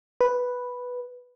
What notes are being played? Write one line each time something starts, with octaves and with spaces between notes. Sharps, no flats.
B4